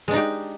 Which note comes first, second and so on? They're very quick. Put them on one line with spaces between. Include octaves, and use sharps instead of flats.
G#3 D4 D#4 G4